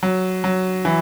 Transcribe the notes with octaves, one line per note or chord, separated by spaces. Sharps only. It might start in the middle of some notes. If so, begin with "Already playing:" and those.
F#3
F#3
E3